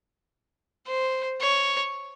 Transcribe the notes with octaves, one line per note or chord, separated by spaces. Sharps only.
C5
C#5